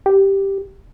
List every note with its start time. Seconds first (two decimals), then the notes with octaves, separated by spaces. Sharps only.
0.06 G4